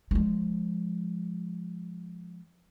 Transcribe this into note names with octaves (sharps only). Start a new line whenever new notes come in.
F3 G#3